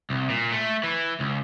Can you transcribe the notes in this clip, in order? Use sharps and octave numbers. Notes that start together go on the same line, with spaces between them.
C2
A#2
A3
E3
C#2